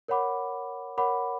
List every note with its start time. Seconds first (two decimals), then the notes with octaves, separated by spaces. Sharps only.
0.08 A#4 C#5 F#5 B5 D6
0.98 A#4 C#5 F#5 B5 D6